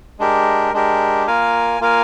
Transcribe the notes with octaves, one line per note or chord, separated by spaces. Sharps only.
G#3 D4 G4 A#4
G#3 D4 G4 A#4
A#3 F4 A#4 F5 G#5
A#3 F4 A#4 F5 G#5